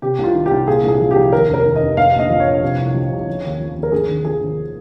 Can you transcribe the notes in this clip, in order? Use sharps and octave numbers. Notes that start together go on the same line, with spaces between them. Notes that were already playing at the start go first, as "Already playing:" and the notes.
C3 G4
C2 F4
D#3
G4
C2
A#2 G#4
C2
G#4
F3
C2 G4
D#2 A#4
F1
A#4
D#3
D#5
F1
G#2 F5
A#1 D#5
F3
C#5
A#1
C3
C2
F3
C2
C#3
D#2
F3
D#2
A#4
G#2 G#4
G#1
F3 G#4
G#1